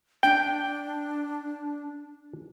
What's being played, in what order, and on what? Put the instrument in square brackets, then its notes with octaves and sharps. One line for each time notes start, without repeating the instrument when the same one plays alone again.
[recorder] D4 [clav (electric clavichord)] G5